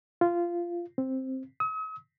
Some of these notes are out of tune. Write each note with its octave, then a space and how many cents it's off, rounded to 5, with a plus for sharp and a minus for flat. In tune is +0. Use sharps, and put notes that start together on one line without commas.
F4 -15
C4 +5
D#6 +45